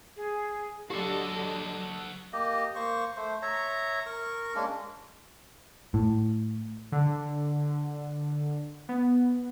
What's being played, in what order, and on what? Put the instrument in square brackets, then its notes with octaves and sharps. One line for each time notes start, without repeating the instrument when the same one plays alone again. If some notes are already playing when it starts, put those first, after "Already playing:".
[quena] G#4
[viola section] D3 D#5 [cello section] F#3 [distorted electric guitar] F#4 A4 [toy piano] G4
[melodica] A#3 G4 D#5
A#3 C5 C#6
A3 C5
C#5 E5 A#5
A#4 C#6
G#3 A#3 C#4 D4
[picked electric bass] A2
[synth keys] D3
B3